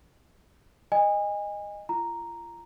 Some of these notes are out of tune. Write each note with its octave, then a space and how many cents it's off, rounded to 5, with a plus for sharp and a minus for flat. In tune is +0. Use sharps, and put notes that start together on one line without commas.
D#5 -10 G#5 -30
F4 -35 A#5 +0